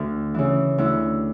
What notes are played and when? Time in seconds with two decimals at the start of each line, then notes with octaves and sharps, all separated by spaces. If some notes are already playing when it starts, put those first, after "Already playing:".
Already playing: D2 F#4
0.34 C#3 E3
0.78 D2 E4